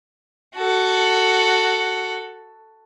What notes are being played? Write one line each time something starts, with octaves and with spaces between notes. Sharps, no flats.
F#4 A4